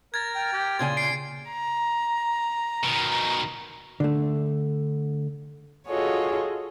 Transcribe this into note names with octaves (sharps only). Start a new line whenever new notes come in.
A#4 G#6 A6
G5 F6
G4
A#2 C#3 G#5 C6 G#6
C7 D7
A#5
B2 D#3
D3 A3
F4 F#4 G#4 A4 C#5 D#5